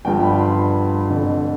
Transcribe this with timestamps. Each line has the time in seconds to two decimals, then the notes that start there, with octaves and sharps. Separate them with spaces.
0.05 G1 G2 F3 G5
0.23 B5
0.39 C6
0.57 B5
1.08 F1 F2 D3